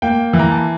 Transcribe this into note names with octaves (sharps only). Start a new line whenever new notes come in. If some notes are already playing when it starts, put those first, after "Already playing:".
A#3 G5
E3
A#5
A5